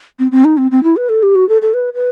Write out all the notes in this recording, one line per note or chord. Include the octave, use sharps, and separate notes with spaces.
C4
C4
D#4
C4
C4
E4
B4
A4
G4
F#4
A4
A4
B4
B4